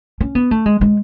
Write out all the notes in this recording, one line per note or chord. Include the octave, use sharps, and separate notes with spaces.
C#4
B3
A3
G#3
G#3